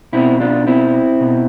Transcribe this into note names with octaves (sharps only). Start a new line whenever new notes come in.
B2 C4 E4
D4 F4
C4 E4
B2